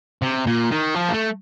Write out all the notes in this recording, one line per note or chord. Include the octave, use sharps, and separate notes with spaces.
C3
A#2
D#3
F3
A#3
A3